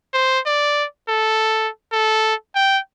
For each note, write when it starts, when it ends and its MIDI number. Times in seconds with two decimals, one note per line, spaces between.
0.14 0.39 72
0.46 0.85 74
1.08 1.68 69
1.92 2.35 69
2.55 2.78 79